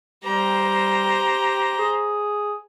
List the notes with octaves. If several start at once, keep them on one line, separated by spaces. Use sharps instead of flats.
G3 G4 C5 A#5
G#4